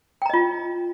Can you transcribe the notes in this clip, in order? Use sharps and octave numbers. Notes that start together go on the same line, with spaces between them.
F4 D#5 G5 A#5